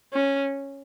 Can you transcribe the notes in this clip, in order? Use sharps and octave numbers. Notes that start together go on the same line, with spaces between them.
C#4